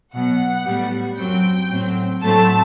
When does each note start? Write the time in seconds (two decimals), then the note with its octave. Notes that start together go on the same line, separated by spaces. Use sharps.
0.13 B2 F#3 B3 F#5
0.66 A2 G3 B3
1.17 F#2 F#3 C4 G5
1.70 A2 F#3 C4
2.22 A2 F#3 A3 C4 A5